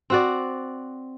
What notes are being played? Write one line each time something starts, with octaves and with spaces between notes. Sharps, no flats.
C4 F#4 D5